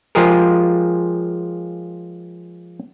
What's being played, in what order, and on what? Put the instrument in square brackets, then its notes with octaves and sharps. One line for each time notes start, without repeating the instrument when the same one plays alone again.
[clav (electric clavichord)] F3 G#3 F4 G4 G#4 A#4